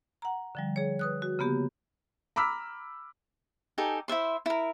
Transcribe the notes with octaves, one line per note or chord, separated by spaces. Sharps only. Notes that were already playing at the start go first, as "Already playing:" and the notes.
F#5 A#5
D3 F3 G3
G#4 C#5
B4 D#6 F#6
F#4
C#3 A#3 B3 G4
A#5 B5 D6 E6 F6 B6
D#4 G4 A4 G#5
E4 C5 E5 C6
E4 A#4